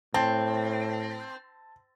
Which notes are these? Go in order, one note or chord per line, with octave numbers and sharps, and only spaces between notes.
A2 C4 A5